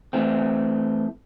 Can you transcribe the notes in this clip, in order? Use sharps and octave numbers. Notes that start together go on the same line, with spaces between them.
E3 A3 C4